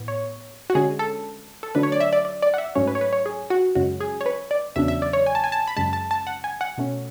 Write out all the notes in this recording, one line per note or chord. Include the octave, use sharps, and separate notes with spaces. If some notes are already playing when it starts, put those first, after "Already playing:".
Already playing: A2 B3
C#5
F#4
D3 G#3 C#4 G#4
A4
A4
D3 F#3 A3 D4 B4
C#5
D5
E5
D5
D5
D5
F#5
E5
G#2 F#3 A3 C#4 C#5
B4
C#5
B4
C#5
G#4
F#4
F#2 C#3 G#3 C#4 F#4
G#4
C#5
B4
D5
E2 C#3 F#3 B3 D4 E5
E5
D5
C#5
G#5
A5
G#5
A5
B5
F#2 C#3 G#3 A5
A5
A5
F#5
G#5
F#5
B2 A3 C#4